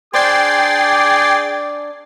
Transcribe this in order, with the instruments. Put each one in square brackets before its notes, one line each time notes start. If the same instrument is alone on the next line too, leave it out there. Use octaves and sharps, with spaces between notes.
[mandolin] D4 C5 [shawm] G#4 [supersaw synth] G5 A6 C7 [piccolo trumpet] D6